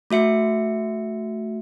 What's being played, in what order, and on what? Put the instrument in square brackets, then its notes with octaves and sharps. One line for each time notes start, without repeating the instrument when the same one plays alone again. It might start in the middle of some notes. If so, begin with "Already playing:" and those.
[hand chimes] A3 F#4 E5 C#7